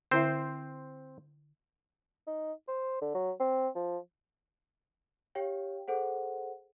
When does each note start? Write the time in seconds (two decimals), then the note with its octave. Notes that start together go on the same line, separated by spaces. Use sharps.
0.11 D3 C4 E4 C5 E5
2.27 D#4
2.68 C5
3.02 D3
3.15 F#3
3.40 C4
3.76 F3
5.35 G4 C#5 F5 G5
5.88 G#4 A4 C5 F#5